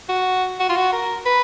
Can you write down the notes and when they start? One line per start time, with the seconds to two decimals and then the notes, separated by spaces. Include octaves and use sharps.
0.09 F#4
0.60 F#4
0.69 F4
0.76 F#4
0.93 A#4
1.26 B4